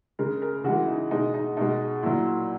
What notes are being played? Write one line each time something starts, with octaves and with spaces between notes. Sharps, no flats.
C#3 G#3 A#4
A#4
C#3 E3 G#3 F#4
D#4
B2 G#3 D#4
D#4
B2 G#3 D#4
A#2 F#3 E4